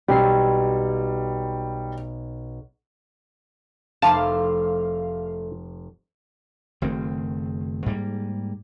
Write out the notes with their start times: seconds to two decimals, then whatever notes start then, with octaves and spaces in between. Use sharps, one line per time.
0.08 B1 G3 C4 C7
4.02 F1 A3 E4 A#4 C5 F5 A5 D6
6.82 F#1 D#3 A3 C4
7.86 G#2 G3 A#3